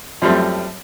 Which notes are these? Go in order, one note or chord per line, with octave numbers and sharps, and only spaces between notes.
F#2 F3 G3 A3 C4